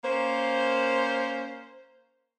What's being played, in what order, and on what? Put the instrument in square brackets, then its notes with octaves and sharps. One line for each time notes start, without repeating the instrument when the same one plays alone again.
[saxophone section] A#3 C#4 C5